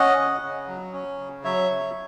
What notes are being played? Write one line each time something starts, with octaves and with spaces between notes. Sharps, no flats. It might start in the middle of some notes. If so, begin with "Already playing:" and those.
Already playing: C#4 D#5 F#5
C#3
C#3
F#3
C#4
C#3
F#3 C#5 E5
C#3